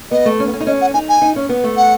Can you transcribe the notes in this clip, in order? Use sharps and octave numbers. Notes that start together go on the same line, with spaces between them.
B3 D#5
A3
C#4
B3
C#4
D#4
C#4 D#5
F#5
D#4 G#5
G#5
D#4
C#4
B3
A3
F#5